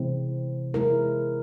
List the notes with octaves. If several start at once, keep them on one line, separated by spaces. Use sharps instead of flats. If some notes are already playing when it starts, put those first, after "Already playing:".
Already playing: C3 E3 G#3 C4 E4
G#3 E4 A#4